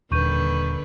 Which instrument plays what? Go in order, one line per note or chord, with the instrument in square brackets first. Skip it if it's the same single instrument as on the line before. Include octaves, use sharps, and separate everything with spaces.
[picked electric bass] D#1 [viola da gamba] D3 D#3 B4 [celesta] C#6 G6 D#7